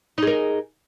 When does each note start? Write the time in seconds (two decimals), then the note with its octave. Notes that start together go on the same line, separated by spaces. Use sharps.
0.18 D#4
0.22 G#4
0.27 A#4